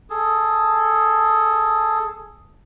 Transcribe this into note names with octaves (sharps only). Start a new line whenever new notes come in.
G#4 A4